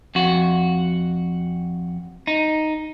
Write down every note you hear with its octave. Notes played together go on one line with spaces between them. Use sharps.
F2 F#4
D#4